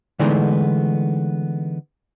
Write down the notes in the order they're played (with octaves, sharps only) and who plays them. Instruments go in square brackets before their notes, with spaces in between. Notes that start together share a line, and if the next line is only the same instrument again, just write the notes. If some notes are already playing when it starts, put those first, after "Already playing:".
[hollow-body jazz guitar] D3 E3 G#3 A3 B3 D#4